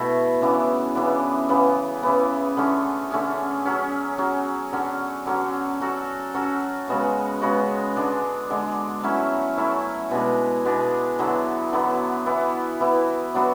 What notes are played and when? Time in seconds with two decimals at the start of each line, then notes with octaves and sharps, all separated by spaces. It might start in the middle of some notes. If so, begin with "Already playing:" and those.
Already playing: B2 A3 E4
0.41 C#3 E3 B3 D4
0.95 C#3 E3 B3 D4
1.49 C#3 E3 B3
2.03 C#3 E3 B3
2.57 D3 A3 C#4 G#4
3.11 D3 A3 C#4 G#4
3.65 F#3 C#4 G#4
4.18 F#3 C#4 G#4
4.73 D3 F#3 C#4
5.26 D3 F#3 C#4
5.81 F#3 C#4 F#4 A4
6.34 F#3 C#4 F#4 A4
6.87 C#3 G#3 B3 F#4
7.41 C#3 G#3 B3 F#4
7.96 D3 G#3 D4
8.50 D3 G#3 D4
9.03 F#3 A3 C#4 E4
9.57 F#3 A3 C#4 E4
10.11 B2 G#3 D4 G#4
10.65 B2 G#3 D4 G#4
11.19 D3 F#3 B3 E4
11.73 D3 F#3 B3 E4
12.26 E3 B3 E4
12.80 E3 B3 E4
13.34 F#3 B3 D4 F#4